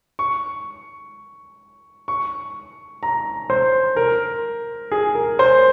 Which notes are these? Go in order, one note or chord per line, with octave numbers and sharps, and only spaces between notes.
C#6
C#6
A#5
C5
A#4
G#4
A#4
C5